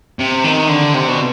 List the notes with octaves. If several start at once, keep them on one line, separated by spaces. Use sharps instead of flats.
C3
D#3
D3
C3
B2